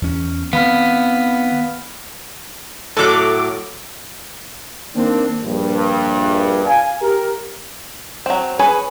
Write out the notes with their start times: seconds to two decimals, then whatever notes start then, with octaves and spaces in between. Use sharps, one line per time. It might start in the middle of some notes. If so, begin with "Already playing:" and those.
0.02 E2 C#4
0.53 D#3 B3 C4 F5 B5 F6
2.97 A2 F#3 A4 D6
4.95 D#3 A#3 C4 D4
5.44 A#1 G2
6.67 F5 G#5
7.01 G4 A#4
8.26 F#3 C4
8.59 G#4 B4 C#5 G#5